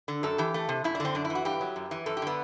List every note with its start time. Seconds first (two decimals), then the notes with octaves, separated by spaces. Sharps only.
0.08 D3
0.23 F#2 A4
0.38 E3 G4
0.54 A3
0.69 C3
0.84 F#2 E4
0.95 D4
1.00 D3 C4
1.15 F#2 D4
1.25 E4
1.30 E3
1.35 F#4
1.45 G2 G4
1.61 F#3
1.76 F#2
1.91 E3
2.06 F#2 A4
2.17 G4
2.22 D3 B3